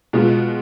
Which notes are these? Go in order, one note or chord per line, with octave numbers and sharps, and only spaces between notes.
B2 G#3 B3 F4